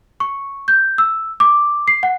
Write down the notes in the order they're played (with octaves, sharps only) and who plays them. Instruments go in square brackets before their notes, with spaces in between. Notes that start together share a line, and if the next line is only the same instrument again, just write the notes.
[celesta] C#6
G6
E6
D6
C7
F#5